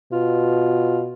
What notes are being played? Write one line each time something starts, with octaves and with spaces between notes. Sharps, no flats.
B2 F4